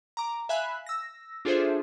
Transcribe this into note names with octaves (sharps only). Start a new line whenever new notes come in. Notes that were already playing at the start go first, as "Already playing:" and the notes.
A#5 D6
E5 F5 G#5 B5 F#6
E6 A#6
D4 F4 G#4 A4 C5 E5